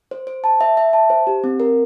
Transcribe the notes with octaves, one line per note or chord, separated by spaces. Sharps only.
C5
C5
A5
E5
E5
A5
C5
G4
C4
A#4